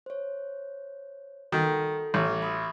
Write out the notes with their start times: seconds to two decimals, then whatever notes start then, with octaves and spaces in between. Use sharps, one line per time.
0.06 C5 C#5
1.52 D#3 F#4 A4
2.14 A1
2.42 B5 D#6 E6